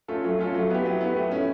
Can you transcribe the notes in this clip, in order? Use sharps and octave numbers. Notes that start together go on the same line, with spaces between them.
A3 C#4 F4 A4
F#3
A3 C#4 F4 A4
F#3
B3 E4 G4
F#3
B3 E4 G4
A3
C#4 E4